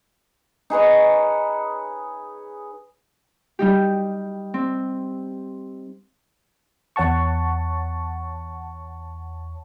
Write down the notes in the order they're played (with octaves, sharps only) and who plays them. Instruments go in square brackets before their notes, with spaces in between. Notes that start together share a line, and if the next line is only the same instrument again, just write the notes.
[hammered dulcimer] D#4 G#4 B4 C#5
[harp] G3 D#4 G4
C4
[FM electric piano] E2 C#5 F#5 A5 C#6